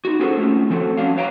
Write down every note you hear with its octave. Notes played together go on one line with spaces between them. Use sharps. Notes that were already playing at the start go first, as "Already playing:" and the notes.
D#4 F#4
C#4 F4 F#4 G#4 A4 C5
A3 C4 C#4 F4
F3 A3 C4 F#4 G4 A4
G3 C#4 D4 F#4 F5
B4 C#5 F5 G5 A5 A#5